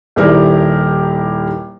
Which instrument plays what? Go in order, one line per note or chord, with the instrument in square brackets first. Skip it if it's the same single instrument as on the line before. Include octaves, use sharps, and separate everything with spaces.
[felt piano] D#1 D#3 E4 G4 A#4 D5